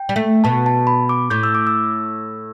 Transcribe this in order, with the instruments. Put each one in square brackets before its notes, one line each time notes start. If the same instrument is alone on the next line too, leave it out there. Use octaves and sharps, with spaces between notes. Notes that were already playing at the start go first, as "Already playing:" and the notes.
Already playing: [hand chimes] G5
[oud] G3
A3
[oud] B2 [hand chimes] A5
[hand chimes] A5
B5
D6
[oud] A2 [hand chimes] G6
[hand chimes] E6
D6
E6